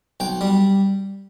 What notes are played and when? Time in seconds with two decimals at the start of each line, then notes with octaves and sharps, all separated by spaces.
0.20 B1 G5
0.41 G3